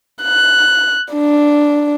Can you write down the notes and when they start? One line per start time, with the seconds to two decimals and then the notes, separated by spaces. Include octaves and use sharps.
0.23 F#6
1.14 D4